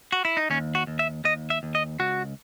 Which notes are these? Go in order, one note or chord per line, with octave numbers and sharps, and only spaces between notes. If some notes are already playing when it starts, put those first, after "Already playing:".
F#4
E4
D#4
D#2 C#4
F#4
D#2
E5
D#2 D#5
E5
D#2
D#5
C#2 F#4